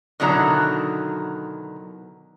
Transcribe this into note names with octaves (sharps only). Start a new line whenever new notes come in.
B2 D3 D#3 F#3 E4 A#5